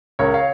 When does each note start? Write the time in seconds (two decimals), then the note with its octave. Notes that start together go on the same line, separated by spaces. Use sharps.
0.19 C#2 A#4 C#5
0.34 C#5 F5